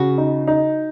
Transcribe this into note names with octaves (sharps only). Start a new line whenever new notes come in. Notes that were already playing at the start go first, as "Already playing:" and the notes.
Already playing: C#3 F#4
D#4
D#4